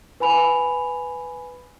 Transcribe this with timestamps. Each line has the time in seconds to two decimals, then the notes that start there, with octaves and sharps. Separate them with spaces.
0.20 B4 G#5 B5 F7